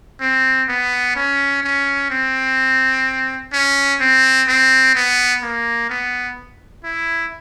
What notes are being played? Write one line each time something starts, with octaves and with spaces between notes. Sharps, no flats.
C4
B3
C#4
C#4
C4
C#4
C4
C4
B3
A#3
B3
E4